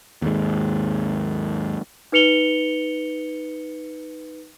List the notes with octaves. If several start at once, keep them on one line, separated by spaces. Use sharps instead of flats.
D#2 G#2
D#4 B4 C#7 F7 G7